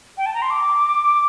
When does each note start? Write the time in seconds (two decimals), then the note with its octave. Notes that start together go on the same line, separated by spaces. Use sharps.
0.17 G5
0.26 A5
0.34 A#5
0.42 C6
0.50 D6